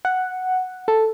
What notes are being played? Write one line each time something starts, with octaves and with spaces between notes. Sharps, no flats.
F#5
A4